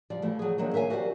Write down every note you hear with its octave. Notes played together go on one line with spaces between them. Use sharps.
F3 G3 D5
E3 F3 A3
F#3 G#4
D#3 F3 F#3 A#3 D4
A#4 E5 F5 G#5
F#4 G4 C5 D5 F5